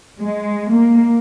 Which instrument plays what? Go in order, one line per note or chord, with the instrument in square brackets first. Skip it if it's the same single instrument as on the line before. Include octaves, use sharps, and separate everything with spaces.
[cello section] G#3
A#3